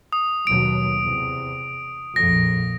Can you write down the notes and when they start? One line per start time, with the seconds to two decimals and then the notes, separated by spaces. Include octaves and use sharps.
0.13 D#6
0.47 D#2 B2 F#3 D7
1.03 E2 C3
2.16 A#1 F2 A#6